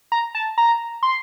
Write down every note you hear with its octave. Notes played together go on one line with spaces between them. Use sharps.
A#5
A5
A#5
C6